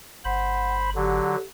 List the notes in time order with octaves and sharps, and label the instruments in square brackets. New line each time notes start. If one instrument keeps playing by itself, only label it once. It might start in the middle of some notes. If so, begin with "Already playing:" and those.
[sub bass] G1 [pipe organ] C5 B5 [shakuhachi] F#5
[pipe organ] D3 F#3 [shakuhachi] G4